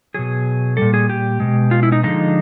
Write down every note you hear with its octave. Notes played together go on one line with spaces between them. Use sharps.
B2 F#3 G#4
A#2 G3 A4
G#4
G4
B2 G#3
F4
E4
D#4
D3 F3 G#3 D#4